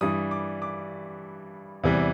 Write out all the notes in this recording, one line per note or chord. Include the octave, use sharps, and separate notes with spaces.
G2 E3 G3 D#6
D6
D6
E2 C3 E3 G3